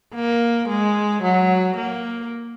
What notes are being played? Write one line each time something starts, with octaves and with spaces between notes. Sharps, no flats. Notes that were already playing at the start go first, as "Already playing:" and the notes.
A#3
G#3
F#3
A#3